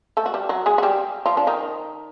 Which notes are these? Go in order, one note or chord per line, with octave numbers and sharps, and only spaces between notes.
A3 A4
F#4
G3 G4
F#3 F#4
G#3 G#4
F#4
G3 G4
F3 F4
D4
D#3 D#4